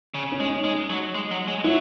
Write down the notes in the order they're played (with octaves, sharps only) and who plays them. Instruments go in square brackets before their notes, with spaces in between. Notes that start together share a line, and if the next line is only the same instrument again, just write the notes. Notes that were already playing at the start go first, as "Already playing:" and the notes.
[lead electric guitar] C#3
[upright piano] C#4
[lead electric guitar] G#3
[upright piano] D#4
[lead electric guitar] G#3
F#3
G#3
F#3
G#3
[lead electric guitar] F#3 [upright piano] E4